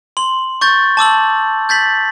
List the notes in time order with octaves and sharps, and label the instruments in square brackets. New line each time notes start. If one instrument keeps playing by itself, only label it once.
[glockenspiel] C6 F#7
C#6 G6 A6
A5 D6 E6 F#7
G6 A6 B6 F#7